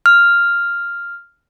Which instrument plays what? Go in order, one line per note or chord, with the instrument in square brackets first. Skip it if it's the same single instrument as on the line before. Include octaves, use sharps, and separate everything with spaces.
[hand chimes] F6